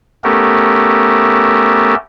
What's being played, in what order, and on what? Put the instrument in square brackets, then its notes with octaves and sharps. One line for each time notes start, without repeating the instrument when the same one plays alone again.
[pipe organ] A3 B3 C#4 G4 A4 A#4